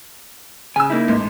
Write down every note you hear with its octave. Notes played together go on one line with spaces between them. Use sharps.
C#3 G#5 E6
A#3 D#4 E4
A1 G#2